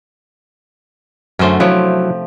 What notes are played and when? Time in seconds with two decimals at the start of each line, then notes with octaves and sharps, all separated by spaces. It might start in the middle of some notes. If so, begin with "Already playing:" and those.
1.39 F#2 D3 A3 C#4 C5
1.60 C3 F3 F#3 E4 G4